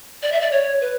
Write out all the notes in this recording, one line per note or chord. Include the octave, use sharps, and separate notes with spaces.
D5
E5
D5
C#5
B4